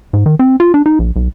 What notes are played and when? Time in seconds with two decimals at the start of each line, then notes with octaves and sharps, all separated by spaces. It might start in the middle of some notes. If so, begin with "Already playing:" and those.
0.13 G#2
0.26 D#3
0.39 C4
0.60 F4
0.74 D4
0.86 D#4
0.99 A#1
1.16 B1